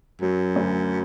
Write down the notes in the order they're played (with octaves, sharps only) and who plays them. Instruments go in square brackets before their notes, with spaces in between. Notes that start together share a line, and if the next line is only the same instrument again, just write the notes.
[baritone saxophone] F#2 [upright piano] F#3
[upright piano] D2